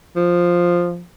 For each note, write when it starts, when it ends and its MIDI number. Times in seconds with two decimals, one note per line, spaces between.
0.16 1.04 53